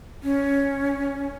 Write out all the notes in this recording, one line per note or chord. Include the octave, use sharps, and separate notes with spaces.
C#4